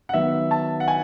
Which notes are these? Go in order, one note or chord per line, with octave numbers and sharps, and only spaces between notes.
F#5
D#3 F#3 B3 E5
A5
F#5
G#5